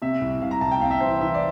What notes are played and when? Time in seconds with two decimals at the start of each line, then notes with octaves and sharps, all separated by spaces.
0.02 C3 E5
0.21 C2
0.42 C2 F5
0.51 A#5
0.61 C2 A5
0.71 G5
0.81 C3 F5
0.91 E5
1.00 E3 C5
1.21 E3 E5
1.34 D5